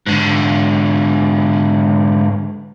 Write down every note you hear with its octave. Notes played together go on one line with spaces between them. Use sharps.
G#2 D3